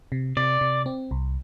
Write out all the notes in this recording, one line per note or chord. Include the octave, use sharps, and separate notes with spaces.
C3
C3 D5
C3
C4
C2